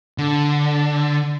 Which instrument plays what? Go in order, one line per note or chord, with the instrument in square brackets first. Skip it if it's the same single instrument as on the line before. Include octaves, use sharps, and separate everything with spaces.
[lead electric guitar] D3